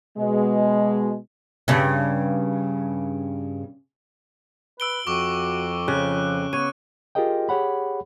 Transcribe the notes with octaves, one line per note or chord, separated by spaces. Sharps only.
B2 G#3
G2 C#3
B4 E6 D7 G7
F2 F#4 C#6 D6
C#3 F3 F#6
B3 C#5 D#7
F4 G4 G#4 A#4 D#5 G5
G4 G#4 C#5 F#5 B5